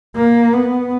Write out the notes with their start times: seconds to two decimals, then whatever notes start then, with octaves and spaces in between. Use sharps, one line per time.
0.16 A#3
0.53 B3